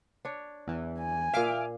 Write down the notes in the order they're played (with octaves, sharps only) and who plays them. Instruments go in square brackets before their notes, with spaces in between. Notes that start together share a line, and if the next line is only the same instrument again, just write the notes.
[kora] D4 C#5
[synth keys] E2 E3
[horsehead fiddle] G#5
[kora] A#2 F5 [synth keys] E5 D6 F6